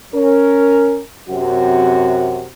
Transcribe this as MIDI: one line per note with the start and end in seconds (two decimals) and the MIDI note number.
0.14 1.00 61
0.14 1.00 70
1.29 2.46 42
1.29 2.46 48
1.29 2.46 66